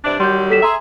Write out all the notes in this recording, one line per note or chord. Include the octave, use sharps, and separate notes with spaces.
G2 C3 D4
D#3 F#3 G3 C6 G6
A4 B6 E7
G#4 E5 A#5 C6